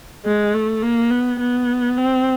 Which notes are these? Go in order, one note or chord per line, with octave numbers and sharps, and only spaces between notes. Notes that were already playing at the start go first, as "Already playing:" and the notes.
G#3
A3
A#3
B3
B3
C4